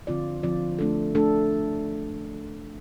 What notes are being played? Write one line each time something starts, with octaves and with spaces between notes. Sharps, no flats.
D3 F3 C4 F4 D5
D3 F3 C4 F4 D5
A3 D4 A4
A3 D4 A4